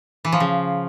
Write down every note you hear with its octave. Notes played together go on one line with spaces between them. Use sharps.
E3
F3
C#3